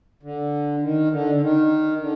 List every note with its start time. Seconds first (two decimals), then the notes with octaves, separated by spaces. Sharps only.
0.23 D3
0.82 D#3
1.11 D3
1.35 D3
1.41 D#3
2.00 D3